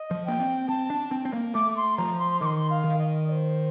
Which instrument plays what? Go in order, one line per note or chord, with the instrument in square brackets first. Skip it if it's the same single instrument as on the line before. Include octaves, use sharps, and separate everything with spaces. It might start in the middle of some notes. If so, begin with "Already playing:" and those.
Already playing: [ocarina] D#5
[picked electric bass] F3
[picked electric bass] A#3 [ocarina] G5
[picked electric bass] C4
[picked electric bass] C4 [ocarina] A5
[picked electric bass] D4
C4
C4
A#3
[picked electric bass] A3 [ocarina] D6
[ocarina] C6
[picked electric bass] F3 [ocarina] A#5
[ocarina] C6
[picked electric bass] D#3 [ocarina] C6 D6
[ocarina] F5
[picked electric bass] D#3
[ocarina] D#5
D5
C5